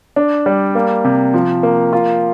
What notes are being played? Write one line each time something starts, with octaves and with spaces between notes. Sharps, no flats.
D4
G3
A#3
C3
F3
A#3
F4